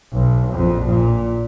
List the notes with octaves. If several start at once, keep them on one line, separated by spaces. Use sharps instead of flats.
B1
A#1 F2
A#2